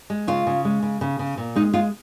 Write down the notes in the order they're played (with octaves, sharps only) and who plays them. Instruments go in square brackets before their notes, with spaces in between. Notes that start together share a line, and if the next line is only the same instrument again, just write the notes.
[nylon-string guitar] G#3
C#3 F4
C#3
G#3
C#3
C#3
C#3
A#2
G#3 D#4
G#3 F4